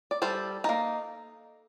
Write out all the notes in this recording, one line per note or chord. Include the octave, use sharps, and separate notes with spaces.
D5
G3 A4 C5
A#3 D#4